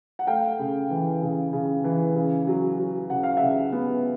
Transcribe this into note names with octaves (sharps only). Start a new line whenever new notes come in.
F#5
A3 F5 G5
C#3
E3
C#3
C#3
E3
C#3
F#3
F#3
C#3 F#5
F5
C#3 E5 F#5
B3